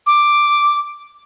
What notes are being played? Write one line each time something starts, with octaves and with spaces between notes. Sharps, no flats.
D6